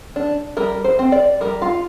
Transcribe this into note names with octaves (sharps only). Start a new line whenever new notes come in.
D4
G3 A#4
C5
C4
D5
G3 A#4
F4